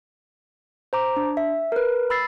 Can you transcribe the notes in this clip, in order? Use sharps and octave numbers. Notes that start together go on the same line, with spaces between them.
C5 A#5 D6
D4
E5
A#4 B4
B5 E6 A6 C7